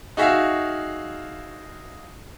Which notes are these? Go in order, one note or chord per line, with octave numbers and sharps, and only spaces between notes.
D#4 F#4 G#4 E5 F5